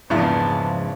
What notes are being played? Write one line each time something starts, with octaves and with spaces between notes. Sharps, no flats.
A#1 E2 G#2 C#3 F3 B3 E4 A5